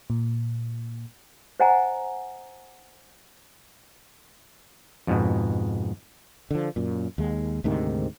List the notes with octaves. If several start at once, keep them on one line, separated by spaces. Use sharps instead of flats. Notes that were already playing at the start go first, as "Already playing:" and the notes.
A#2
C5 D#5 F#5 G#5 A#5
F2 G#2 B2
D3 F3
F#2 A#2
D#2 G#3
D2 G#2 C3 D#3